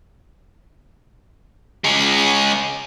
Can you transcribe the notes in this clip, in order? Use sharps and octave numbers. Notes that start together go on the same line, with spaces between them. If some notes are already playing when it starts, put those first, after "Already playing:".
G#3 C#4